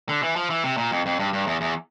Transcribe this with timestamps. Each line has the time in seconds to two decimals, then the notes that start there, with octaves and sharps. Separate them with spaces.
0.09 D3
0.23 E3
0.36 F3
0.50 E3
0.64 C3
0.77 A#2
0.91 F2
1.06 F2
1.19 G2
1.33 G2
1.47 E2
1.61 E2